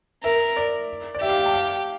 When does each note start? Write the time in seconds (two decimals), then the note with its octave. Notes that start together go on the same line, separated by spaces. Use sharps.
0.24 A#4 E5
0.57 D5
1.15 D5
1.21 G4 E5
1.29 F5
1.37 G5
1.46 A5
1.54 F5